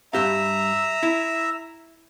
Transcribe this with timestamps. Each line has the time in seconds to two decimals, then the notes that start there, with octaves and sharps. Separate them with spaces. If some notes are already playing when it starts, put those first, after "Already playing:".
0.13 G2 G4 E5 F5 A#5
1.03 E4